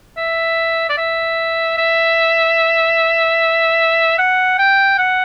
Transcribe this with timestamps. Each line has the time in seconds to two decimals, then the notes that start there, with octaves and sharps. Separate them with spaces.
0.17 E5
0.89 D5
0.97 E5
1.78 E5
4.18 F#5
4.58 G5
4.98 F#5